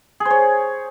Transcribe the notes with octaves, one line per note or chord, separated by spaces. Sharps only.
G#4
C5
C#5